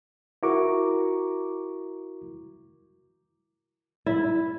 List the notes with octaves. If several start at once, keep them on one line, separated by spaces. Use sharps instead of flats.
E4 F#4 A#4 A#5 C#6 D6
E4